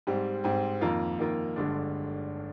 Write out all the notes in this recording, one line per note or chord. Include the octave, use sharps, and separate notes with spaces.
G#2 G3 C4
G#2 G3 C4
F2 D#3 A#3 F4 A#4
F2 D#3 A#3 F4 A#4
G1 G2 D3 G#3 D4